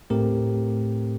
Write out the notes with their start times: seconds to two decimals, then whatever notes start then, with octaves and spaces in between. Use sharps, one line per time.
0.10 A2 A3 C4 G4 A#4